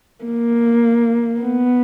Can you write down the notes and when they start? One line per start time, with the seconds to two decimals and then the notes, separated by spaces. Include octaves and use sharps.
0.25 A#3
1.41 B3